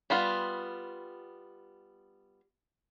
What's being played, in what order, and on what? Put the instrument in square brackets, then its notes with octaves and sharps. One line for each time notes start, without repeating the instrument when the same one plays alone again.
[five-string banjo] G3 B3 F4